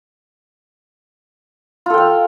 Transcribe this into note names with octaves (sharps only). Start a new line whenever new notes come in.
F4 A4 F5 G5